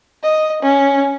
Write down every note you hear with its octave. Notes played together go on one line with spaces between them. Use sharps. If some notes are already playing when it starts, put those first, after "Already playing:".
D#5
C#4